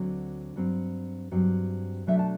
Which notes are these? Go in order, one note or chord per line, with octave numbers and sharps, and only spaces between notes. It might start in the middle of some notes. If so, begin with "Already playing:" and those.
Already playing: D2 D3 F#3 C4
G2 F#3 C4
G2 F#3 C4
B2 F#3 A3 D4 E5
A5